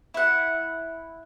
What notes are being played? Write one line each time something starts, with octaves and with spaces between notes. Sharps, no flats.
E4 F#5